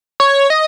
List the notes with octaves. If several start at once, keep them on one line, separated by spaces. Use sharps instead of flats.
C#5
D#5